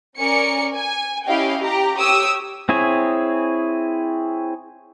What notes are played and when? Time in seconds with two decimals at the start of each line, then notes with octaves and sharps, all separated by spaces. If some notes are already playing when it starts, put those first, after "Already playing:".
0.16 C#4 A#4 D5 G#5 C#7
0.74 G#5
1.26 C#4 E4 G4 D#5 F5 G5
1.61 G4 A#5
1.96 G4 C#5 D#6 E6
2.69 C4 E4 G#4 C#5